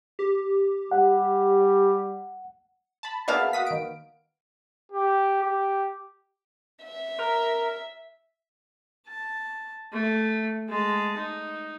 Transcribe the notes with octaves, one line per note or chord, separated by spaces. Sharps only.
G4
G3 F#5
A5 B5
B2 A#3 G#4 E5 F5 A5
F#4 D#6 B6
D#3 D7
G4
G4
E5
A#4
A5
A3
G#3 A5
D#4